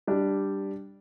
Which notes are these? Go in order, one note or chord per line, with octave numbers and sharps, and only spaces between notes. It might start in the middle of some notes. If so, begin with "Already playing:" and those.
G3 D4 G4